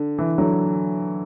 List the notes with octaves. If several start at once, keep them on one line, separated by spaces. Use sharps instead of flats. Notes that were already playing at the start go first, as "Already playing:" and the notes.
Already playing: D3
E3
D3 F#3